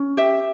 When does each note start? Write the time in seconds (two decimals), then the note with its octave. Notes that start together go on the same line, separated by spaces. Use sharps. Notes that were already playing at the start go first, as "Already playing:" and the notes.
Already playing: C#4
0.17 G4 E5